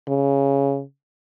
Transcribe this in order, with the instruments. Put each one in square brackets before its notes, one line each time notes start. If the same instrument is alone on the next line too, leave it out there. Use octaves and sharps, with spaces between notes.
[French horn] C#3